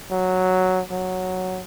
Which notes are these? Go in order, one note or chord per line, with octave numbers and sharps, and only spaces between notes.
F#3
F#3